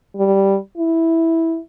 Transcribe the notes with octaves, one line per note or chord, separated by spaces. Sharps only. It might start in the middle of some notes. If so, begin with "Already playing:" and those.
G3
E4